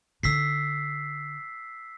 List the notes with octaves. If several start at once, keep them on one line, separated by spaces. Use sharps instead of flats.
D3 D#4 E6 B6 C7